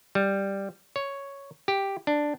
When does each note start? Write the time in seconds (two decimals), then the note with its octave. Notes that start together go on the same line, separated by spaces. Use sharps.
0.15 G3
0.96 C#5
1.68 G4
2.07 D4